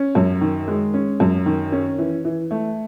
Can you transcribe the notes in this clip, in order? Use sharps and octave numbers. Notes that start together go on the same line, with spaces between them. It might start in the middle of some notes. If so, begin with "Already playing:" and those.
Already playing: C#4
F#2
D#3
G#3
C#4
F#2
D#3
C#4
E3
E3
A3